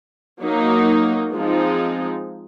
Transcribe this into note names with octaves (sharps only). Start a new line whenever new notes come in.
F#3 A#3 D#4
F3 G#3 C4 D#4